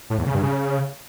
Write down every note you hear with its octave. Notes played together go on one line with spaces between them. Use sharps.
A2
E2
C#3
G2
C#3